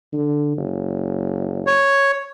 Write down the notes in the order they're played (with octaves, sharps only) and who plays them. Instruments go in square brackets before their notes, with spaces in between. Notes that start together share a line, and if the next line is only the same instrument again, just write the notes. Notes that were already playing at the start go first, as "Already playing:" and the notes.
[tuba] D3
F#1
[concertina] C#5